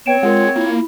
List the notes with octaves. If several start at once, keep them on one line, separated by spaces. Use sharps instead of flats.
B3 C4 C#5 G5 D7 E7
G#3 F4 A#4 F#5
A#3 E4 F4